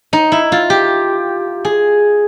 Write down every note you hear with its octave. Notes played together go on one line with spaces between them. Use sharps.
D#4
E4
F4
G4
G#4